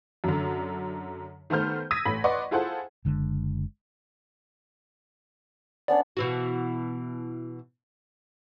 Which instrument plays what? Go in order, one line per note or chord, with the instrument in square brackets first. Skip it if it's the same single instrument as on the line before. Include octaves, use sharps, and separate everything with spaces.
[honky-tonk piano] F#2 D3
D#3 A3 B3 C5 F6 G6
D#6 E6 G#6 A#6 B6 D#7
A1 A3 B5 B6
B4 D5 D#5 F#5 C6 C#6
E4 F4 G#4 A4 C5 F#5
[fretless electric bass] F#1 D3 G#3
[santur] B3 C#4 D4 [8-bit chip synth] D5
[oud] B2 E3 F#4